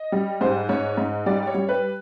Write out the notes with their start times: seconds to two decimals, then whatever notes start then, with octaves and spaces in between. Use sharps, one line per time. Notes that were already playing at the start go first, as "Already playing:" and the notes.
Already playing: D#5
0.12 G3
0.41 G#2 C5
0.69 G#2 C#5
0.97 G#2
1.26 G3 D5
1.47 C#5
1.54 G3
1.69 B4